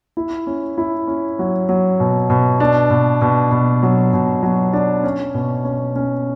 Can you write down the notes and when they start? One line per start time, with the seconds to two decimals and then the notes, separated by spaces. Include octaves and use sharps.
0.17 E4
0.47 C#4
0.78 E4
1.07 C#4
1.39 F#3
1.69 F#3
2.00 B2
2.30 B2
2.60 D4
2.90 B2
3.21 B2
3.51 B2
3.83 F#3
4.13 B2
4.43 F#3
4.73 D4
5.04 C#4
5.34 B2
5.65 C#4
5.96 C#4